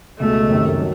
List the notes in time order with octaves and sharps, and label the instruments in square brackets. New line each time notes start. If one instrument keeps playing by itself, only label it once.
[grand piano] C#2 B2 G#3 [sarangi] A3
[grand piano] F#2 D#3 G3 C4
F#3